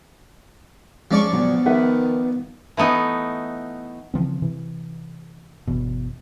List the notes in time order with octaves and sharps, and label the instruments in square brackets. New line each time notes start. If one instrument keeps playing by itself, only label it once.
[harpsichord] F3 D5 C#6 [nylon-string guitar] G#3 C#4
[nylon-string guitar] A#2 D3 F#3 [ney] B3
[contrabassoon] D#3 [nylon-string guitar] B4 E5 F#5
[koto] E3 A3 B3 D#4
[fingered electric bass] C#3 E3 F3 C4
C3 E3
G1 E2 B2